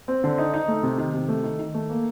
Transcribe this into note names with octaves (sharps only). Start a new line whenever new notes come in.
C4
D3
D#4
D#4
A3
C3
D#3
C3
A3
D#3
D#3
A3
A#3